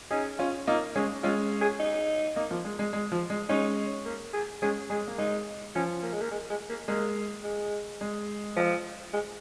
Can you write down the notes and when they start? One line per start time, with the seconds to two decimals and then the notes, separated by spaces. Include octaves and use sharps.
0.11 C#4 D#4 G#4
0.39 C#4 F4
0.67 A#3 D#4 F4
0.96 G#3 C#4 G#4
1.23 G#3 C#4 F4
1.61 G#4
1.80 D#4
2.36 A#3 D#4
2.50 F3 A#3
2.65 G#3
2.79 G#3
2.93 G#3
3.12 F3
3.30 G#3
3.49 G#3 C#4 D#4
4.05 A#3
4.34 G#4
4.62 G#3 C#4 G#4
4.90 G#3 G#4
5.08 A#3
5.18 G#3 D#4
5.75 F3 C#4
6.03 A#3
6.12 G#3
6.21 A#3
6.31 G#3
6.50 G#3
6.69 A#3
6.88 G#3 A#3
7.44 G#3
8.01 G#3
8.57 F3
9.13 G#3